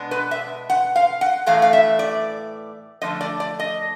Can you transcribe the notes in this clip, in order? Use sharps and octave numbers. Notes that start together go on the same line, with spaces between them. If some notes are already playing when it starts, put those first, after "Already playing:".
Already playing: B2 G#3 B3 D4
B4
E5
F#5
F5
F#5
A2 E3 A3 F5
F5
E5
D5
D3 F3 A3 D4 D#5
D5
D5
D#5